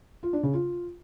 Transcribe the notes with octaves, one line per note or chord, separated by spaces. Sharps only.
F4
D4
C#3
F4